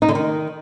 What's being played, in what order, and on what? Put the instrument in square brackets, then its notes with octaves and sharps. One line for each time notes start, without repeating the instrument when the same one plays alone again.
[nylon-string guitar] D#4
D3
D#3